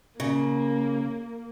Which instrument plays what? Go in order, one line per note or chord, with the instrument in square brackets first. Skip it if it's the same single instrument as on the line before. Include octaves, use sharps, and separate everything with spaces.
[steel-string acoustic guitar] C#3 [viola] A#3